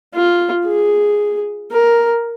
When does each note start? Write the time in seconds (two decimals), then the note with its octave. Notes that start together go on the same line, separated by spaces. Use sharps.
0.14 F4
0.66 G#4
1.72 A#4